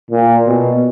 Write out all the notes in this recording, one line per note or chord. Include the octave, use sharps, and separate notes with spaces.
A#2
B2